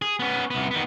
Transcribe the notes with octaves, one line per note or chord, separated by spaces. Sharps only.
G#4
B3 C#4
C2 B3
D#3 B3